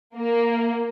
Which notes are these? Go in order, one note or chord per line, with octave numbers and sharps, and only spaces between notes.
A#3